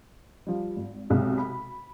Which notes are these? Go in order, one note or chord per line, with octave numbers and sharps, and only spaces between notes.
F3 G3
G#1
B1 G#2 C3
B5